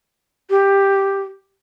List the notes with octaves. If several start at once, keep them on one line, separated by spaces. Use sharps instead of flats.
G4